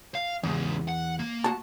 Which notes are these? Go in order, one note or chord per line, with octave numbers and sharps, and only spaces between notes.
F5
E2 G#2 C#3
F#5
A#3
F#4 A5